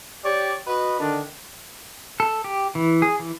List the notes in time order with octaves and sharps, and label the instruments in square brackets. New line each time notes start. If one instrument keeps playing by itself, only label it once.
[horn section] G4 C#5 D5
F#4 B4 D#5
D3 D#3 D4
[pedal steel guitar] A4
G4
E3
G#4
E3